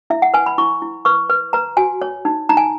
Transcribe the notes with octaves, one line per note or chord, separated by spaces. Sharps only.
E4 E5
F#5
B4 G#5
B5
E4 C#6
E4
B4 C#6
B4
B4 A#5
F#4 G#5
C#5
D#4
D#4 A#5
G#5